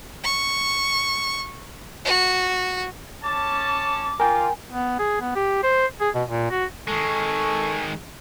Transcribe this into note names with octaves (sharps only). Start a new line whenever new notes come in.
C#6
F#4
C#4 A5 D6
F4 A#4 G5 G#5
B3
G#4
B3
G4
C5
G#4
B2
A#2
F#4
D#3 G#3 A4 G#5 C#6